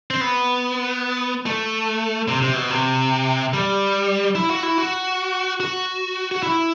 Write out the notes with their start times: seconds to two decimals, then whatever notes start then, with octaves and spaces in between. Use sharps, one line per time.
0.10 C4
0.21 B3
1.46 A3
2.28 C3
2.42 C3
2.55 B2
2.70 C3
3.53 G3
4.35 E4
4.50 F#4
4.63 E4
4.78 F#4
5.60 F#4
6.31 F#4
6.43 E4